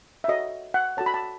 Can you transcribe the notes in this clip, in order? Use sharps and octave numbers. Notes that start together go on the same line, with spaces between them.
E5
F#4 A4 C#5 D#5
F#5
F#4 A4 C#5 A5
B5
A5